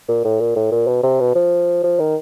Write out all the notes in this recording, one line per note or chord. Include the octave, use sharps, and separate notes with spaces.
A#2
A2
A#2
A2
A#2
B2
C3
B2
F3
F3
D#3